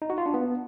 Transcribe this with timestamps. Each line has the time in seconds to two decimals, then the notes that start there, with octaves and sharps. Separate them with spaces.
0.02 D#4
0.10 F#4
0.18 F4
0.26 D4
0.34 B3